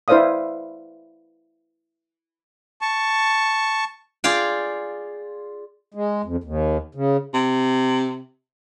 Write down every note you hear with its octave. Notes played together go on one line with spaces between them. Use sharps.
E4 B4 C5 D5 F5 D#6
A5 C#6
F4 G#4 D5 F5 G5
G#3
F2
D#2
C#3
C3